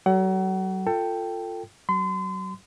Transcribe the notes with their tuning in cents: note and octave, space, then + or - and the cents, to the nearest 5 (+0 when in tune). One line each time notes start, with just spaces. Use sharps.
F#3 +40 A4 +0 F#5 +35
F4 +0 A4 +20 G5 +0
F#3 +30 C6 -35